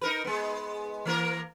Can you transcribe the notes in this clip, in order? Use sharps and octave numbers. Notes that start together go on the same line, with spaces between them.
D#4 A#4 B4
G#3 B3
E3 A#3 A#4